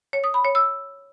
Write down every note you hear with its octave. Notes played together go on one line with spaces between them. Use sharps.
C#5
D#6
B5
C#5
E6